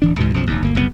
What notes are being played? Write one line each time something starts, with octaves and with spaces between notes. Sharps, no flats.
D1 E3 D4
C#2 G#2 B2 E3
B1 F#2 F3
E1 D#2
G1 D2 A#3
F#1 C2 D3 B3